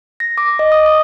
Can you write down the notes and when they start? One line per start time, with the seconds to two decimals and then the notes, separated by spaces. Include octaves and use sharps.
0.20 A#6
0.38 D6
0.59 D#5
0.72 D#6
0.86 D#6